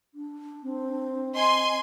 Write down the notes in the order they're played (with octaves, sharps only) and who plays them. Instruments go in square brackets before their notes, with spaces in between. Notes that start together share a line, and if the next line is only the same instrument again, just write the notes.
[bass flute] D4
[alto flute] C4
[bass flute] D#5 [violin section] G#5 C6